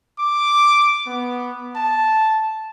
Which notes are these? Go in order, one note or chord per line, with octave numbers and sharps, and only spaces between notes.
D6
B3
A5